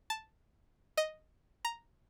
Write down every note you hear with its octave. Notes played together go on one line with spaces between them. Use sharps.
A5
D#5
A#5